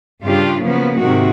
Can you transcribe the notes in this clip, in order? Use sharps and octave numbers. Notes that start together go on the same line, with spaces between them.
G2 C#3 D4 F4 G4
C#3 F3 F#3 A#3 B3
G#2 C3 D#3 A#3 F#4